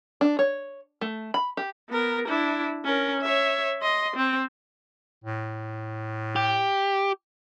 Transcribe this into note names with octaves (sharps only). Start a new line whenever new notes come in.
D4
C#5
A3
B5
G4
B3 A#4
D4 E4
C#4 A#4
C#5 E5
D#5 C6
C4
A2
G4